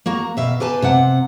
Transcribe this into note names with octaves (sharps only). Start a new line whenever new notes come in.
A#3 F#4 A#5
B2 E5 F5
G4 B4 G#5 A5
C3 C4 F#5